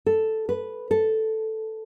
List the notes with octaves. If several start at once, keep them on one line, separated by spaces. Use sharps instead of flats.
A4
B4
A4